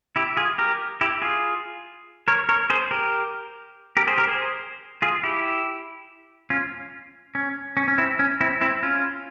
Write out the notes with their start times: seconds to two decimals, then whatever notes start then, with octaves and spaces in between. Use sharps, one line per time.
0.16 E4 G4
0.37 F4 G#4
0.58 G4 A#4
1.01 E4 G4
1.22 F4 G#4
2.28 A#4 C#5
2.49 A#4 C#5
2.70 G#4 C5
2.91 G4 A#4
3.97 G4 A#4
4.07 G#4 C5
4.18 G4 A#4
4.28 G#4 C5
5.02 F4 G#4
5.23 E4 G4
6.50 C#4 F4
7.35 C#4
7.77 C#4
7.88 C#4
7.98 C4 E4
8.19 C#4
8.41 C4 E4
8.61 C4 E4
8.83 C#4 F4